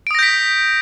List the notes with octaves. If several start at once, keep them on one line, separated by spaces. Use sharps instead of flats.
D#6 G6 A#6 B6 D7